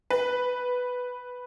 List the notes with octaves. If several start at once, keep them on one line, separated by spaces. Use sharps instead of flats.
B4